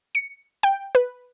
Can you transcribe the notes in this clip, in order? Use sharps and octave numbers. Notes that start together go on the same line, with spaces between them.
C#7
G5
B4